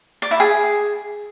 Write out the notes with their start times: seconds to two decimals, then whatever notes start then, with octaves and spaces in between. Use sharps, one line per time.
0.22 D5
0.31 E4
0.40 G#4